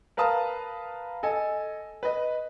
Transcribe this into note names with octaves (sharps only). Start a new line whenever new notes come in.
A#4 B4 F5 A5 D#6
A4 D#5 G#5
B4 D#5